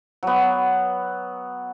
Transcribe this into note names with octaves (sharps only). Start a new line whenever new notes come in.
F#3 B3